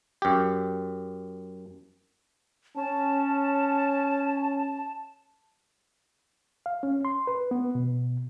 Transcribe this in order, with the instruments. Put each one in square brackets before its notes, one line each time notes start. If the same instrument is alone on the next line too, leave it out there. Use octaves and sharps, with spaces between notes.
[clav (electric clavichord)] F#2 G4
[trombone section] C#4 [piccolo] A5
[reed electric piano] F5
C#4
C6
B4
B3
B2